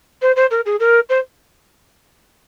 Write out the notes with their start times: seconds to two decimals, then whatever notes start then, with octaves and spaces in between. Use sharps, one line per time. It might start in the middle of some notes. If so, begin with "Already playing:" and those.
0.22 C5
0.36 C5
0.51 A#4
0.66 G#4
0.80 A#4
1.09 C5